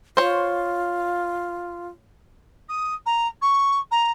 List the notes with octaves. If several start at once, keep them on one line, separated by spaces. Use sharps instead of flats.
F4 C5 C#5
D#6
A#5
C#6
A#5